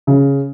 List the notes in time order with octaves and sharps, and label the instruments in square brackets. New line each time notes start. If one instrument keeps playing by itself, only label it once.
[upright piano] C#3